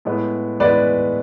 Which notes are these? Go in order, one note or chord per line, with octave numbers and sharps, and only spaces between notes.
A2 G#3 B3
A2 G#3 B3 B4 D5